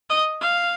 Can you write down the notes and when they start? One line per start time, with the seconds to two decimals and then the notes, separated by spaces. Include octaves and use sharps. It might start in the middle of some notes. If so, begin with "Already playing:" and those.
0.10 D#5
0.41 F5